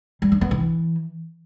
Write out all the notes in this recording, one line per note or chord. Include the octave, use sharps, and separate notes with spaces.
G3
D4
B3
E3